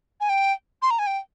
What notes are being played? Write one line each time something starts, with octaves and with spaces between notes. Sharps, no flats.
G#5
G5
C6
A#5
G#5
G5